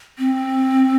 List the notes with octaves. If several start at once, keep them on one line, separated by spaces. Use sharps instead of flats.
C4